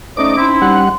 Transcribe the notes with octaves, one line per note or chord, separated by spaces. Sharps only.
A3 C#4 D#4 C5 D5 D#5 D6
C4 D#4 E4 C6
G3 F#5